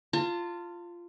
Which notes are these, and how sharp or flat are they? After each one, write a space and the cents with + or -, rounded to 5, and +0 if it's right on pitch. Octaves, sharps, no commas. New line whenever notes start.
F4 -10 A5 +35